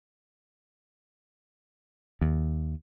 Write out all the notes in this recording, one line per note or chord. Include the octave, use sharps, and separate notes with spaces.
D#2